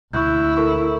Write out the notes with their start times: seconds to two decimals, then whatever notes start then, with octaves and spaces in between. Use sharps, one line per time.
0.13 D2 E4 C#6 F#6 G6
0.57 A4 A#4 C#6